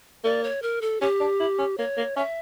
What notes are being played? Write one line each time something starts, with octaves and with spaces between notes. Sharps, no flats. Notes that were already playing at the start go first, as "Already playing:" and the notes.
A#3 D5
C#5
A#4
A4
C#4 G4
D4
E4
C#4
A#3 C#5
A#3
C#4 E5